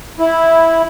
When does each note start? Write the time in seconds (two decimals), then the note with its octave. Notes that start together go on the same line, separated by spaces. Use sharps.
0.19 E4